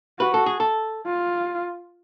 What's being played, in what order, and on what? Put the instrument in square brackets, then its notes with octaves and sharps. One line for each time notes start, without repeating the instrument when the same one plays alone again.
[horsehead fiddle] F#4 [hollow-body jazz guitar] B4
[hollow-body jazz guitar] A4
G#4
A4
[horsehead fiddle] F4